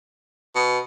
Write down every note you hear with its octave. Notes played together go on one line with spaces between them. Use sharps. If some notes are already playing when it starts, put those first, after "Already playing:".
B2